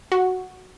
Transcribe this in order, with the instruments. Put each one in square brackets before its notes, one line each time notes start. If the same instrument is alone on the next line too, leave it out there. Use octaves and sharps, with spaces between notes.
[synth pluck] F#4